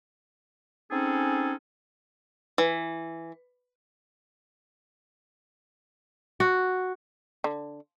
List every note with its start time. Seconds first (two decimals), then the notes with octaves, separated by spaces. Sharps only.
0.91 C4 C#4 D#4 G#4 A4
2.58 E3
6.40 F#4
7.44 D3